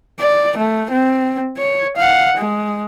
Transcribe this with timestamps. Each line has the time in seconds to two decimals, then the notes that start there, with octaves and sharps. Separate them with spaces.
0.19 D5
0.57 A3
0.91 C4
1.58 C#5
1.97 F5 F#5
2.37 G#3